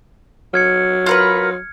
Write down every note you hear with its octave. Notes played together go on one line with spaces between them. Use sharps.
F#3 F6 G#6 C#7
F4 A#4 B4